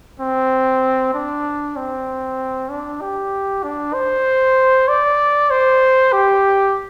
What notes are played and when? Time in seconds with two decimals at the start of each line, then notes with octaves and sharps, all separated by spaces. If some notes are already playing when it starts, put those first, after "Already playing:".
0.20 C4
1.14 D4
1.76 C4
2.70 D4
3.01 G4
3.63 D4
3.94 C5
4.88 D5
5.50 C5
6.13 G4